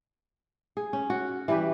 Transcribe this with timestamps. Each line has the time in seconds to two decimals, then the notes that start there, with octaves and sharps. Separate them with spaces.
0.77 G#4
0.93 C#4
1.10 F#4
1.48 E3 G3 G4 B4